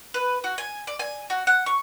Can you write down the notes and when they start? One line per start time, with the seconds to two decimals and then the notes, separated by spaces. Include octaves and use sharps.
0.14 B4
0.44 F#4
0.58 G#5
0.87 D5
0.99 G#5
1.30 F#4
1.47 F#5
1.66 C#6